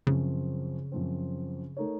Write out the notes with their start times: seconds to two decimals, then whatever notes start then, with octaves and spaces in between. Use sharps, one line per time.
0.07 F#2 C#3 F3 C4
0.92 F#2 F3 C4
1.77 A3 D#4 A#4 C#5